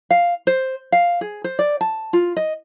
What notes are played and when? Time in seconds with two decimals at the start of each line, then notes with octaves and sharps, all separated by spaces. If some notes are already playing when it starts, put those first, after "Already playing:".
0.11 F5
0.47 C5
0.92 F5
1.21 G#4
1.44 C5
1.59 D5
1.81 A5
2.13 F4
2.37 D#5